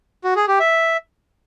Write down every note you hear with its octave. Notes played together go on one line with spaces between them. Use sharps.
F#4
G#4
G4
E5